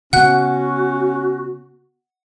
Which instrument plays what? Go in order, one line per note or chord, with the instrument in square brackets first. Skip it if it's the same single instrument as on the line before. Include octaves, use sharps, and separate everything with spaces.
[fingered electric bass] C#3 B3 [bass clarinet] C#4 [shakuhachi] F#4 [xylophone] F#5 F#6